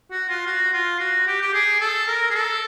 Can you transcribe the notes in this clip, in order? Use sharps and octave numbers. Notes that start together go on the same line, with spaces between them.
F#4
F4
F#4
F4
F#4
G4
G4
G#4
A4
A#4
G#4
A4